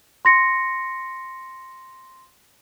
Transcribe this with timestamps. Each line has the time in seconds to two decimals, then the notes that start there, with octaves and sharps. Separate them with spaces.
0.25 C6 A#6 C#7